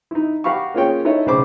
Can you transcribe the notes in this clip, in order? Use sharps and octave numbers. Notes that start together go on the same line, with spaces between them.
D#4 E4
F#4 G4 F5 B5 C#6
A#3 C#4 F4 G#4 C#5 G5
D#4 E4 A4 C#5 D#5 E5
B1 A2 C#3 C5 B5 D6